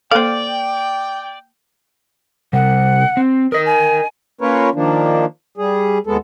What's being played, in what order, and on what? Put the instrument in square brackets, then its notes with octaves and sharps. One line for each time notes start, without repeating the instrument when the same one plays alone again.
[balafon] A#3 A4 [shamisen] C5 F5 [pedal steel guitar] D5 [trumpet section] G5
[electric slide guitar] C3 G3 [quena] F#5
[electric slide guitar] C4
[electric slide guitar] A#4 D#5 [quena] D#6
[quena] G#5
[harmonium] A#3 C#4 F4 A#4 B4 C#5
D#3 F3 A#3 D4
G3 G#4
D#2 G#3 B3 A4